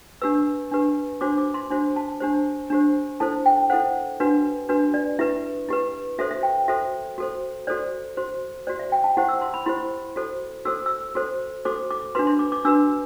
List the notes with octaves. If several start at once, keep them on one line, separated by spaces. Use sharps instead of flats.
D4 G4 B4 E6
D4 G4 B4
D4 F#4 C5 D6
D6
C6
D4 F#4 C5 C6
A5
D4 G4 C5
D4 G4 C5
E4 A4 C5 A5
G5
E4 A4 C5 F#5
D4 F#4 B4
D4 F#4 B4
D5
E4 G4 B4 E5
E4 G4 B4
F#4 A4 C5 E5
E5
G5
F#4 A4 C5 E5
F#4 A4 C5
F#4 A4 C5 D5
F#4 C5
F#4 C5 D5
E5
G5
A5
E4 G4 C5 F#5
E6
C6
B5
E4 G4 C5 C6
F#4 A4 C5
F#4 A4 C5 E6
E6
F#4 A4 C5
F#4 A4 C5 D6
D6
D4 F#4 B4 C6
C6
D6
D6
D4 F#4 B4 E6